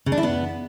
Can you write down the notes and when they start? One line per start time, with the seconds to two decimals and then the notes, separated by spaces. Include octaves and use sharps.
0.06 C#3
0.12 D4
0.18 E4
0.23 B3